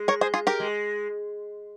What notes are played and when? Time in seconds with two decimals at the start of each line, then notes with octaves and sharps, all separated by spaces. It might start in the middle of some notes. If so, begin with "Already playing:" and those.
Already playing: G#3
0.08 A#4 C#5
0.21 G#4 C5
0.34 F4 G#4
0.47 G4 A#4
0.60 G#3